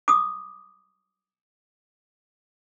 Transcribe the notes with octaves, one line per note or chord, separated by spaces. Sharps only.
D6 D#6